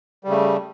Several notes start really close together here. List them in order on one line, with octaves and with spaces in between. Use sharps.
G3 C#3 A3